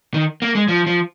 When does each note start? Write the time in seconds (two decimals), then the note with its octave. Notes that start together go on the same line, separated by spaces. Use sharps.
0.14 D#3
0.42 A#3
0.55 G#3
0.68 F3
0.87 F3